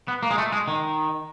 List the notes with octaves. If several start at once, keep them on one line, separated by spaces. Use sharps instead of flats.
B3
A#3
G#3
A3
G#3
D#3